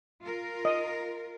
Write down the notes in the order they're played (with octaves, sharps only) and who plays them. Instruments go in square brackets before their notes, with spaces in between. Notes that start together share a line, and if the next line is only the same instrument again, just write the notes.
[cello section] F4 A#4
[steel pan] D#5